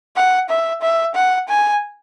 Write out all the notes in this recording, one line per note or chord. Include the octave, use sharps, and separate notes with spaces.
F#5
E5
E5
F#5
G#5